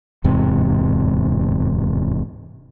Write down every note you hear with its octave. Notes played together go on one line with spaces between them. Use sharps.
D1 E2 G#2 C3